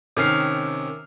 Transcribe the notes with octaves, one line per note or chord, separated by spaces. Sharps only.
C3 D#3 C#4 F6 C7